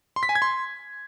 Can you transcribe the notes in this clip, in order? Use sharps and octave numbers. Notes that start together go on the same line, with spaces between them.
C6
B6
G#5
G#6
C6